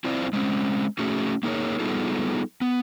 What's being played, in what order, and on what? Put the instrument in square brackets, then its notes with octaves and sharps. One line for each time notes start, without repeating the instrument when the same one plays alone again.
[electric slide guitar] C4 E4 F4 C5 D5
G#3 C4 C#4
A3 C#4 F#4 G#4
A#3 D#4 G#4 A#4 C#5
G3 B3 D#4 F4 G#4 A4
B3